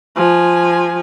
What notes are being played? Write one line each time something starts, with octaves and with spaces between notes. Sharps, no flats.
F3 G#5